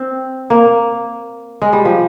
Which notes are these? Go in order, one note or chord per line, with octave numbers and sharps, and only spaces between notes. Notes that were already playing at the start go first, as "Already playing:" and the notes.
Already playing: C4
A#3
G#3
G3
F3